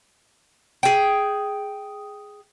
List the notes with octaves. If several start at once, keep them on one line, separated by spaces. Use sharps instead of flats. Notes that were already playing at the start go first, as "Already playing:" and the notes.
G#4 G5